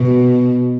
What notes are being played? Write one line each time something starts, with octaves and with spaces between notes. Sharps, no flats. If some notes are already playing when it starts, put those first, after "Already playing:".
Already playing: B2